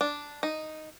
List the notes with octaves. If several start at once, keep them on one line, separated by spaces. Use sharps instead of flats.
D4
D#4